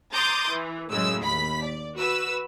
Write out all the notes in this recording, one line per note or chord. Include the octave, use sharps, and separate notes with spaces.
A#5 C6 D6 D#6 G6 A6
E3
F#2 A2 C#3 G#3 E6
D#2 B5 B6
D5
F#4 B4 E6